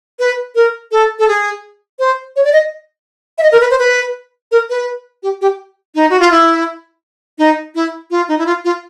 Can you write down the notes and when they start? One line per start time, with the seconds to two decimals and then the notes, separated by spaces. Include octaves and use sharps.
0.19 B4
0.55 A#4
0.92 A4
1.19 A4
1.28 G#4
1.99 C5
2.36 C#5
2.45 D5
2.53 D#5
3.38 E5
3.43 D#5
3.52 A#4
3.61 B4
3.70 C5
3.79 B4
4.52 A#4
4.70 B4
5.23 G4
5.41 G4
5.95 D#4
6.10 F#4
6.20 F4
6.31 E4
7.38 D#4
7.75 E4
8.11 F4
8.28 D#4
8.39 E4
8.46 F4
8.65 F4